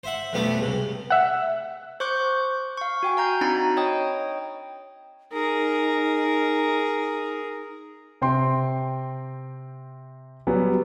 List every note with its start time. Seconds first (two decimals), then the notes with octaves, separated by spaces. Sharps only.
0.04 C5 E5 F#5
0.33 F2 B2 G3 A3 B3 D4
0.59 C#2 C3
1.10 E5 F#5
2.00 C5 C#6 D6 F#6 G6
2.77 F5 C#6
3.03 F#4 G5 G#5
3.17 F5 A#5 G6
3.41 C4 D4 D#4 F#4 A#5 B5
3.77 C#5 D#5 G5 D#6
5.32 D#4 G#4 A#4
8.22 C3 C4 G5 C6
10.47 F#3 G3 B3